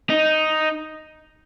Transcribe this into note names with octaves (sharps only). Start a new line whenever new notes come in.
D#4